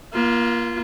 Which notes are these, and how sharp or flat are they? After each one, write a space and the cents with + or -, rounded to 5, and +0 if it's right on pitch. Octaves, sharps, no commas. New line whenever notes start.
A#3 +30 F4 -20